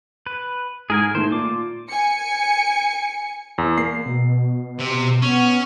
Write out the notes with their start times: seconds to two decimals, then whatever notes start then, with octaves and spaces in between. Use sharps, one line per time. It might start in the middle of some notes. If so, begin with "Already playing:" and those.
0.27 B4
0.90 G#2 G#4 A#4 G#5
1.15 D#3 A3 C5
1.31 A#2 F4 D6
1.89 G#5 C#7
3.58 E2
3.78 A#3 C7
4.06 B2
4.79 C3
5.22 B3 C#4